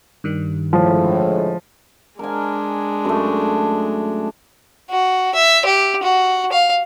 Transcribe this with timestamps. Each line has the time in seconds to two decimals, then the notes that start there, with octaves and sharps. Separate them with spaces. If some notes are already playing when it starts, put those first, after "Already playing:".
0.24 G2 D#3 G3
0.73 A2 D3 F3 G#3
2.19 G#3 D4 A#4 G#5
3.05 F#2 A3
4.90 F#4
5.35 E5
5.65 G4
6.03 F#4
6.52 F5